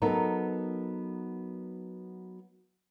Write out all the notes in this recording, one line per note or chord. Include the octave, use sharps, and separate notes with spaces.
F#3 B3 D#4 A4 A#4